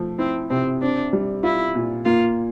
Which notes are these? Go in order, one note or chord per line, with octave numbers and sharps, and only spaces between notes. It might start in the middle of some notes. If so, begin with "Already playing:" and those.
Already playing: F3 A3
C4 E4
C3 C4
C4 D4
G3
E4 F4
A#2
A#3 F4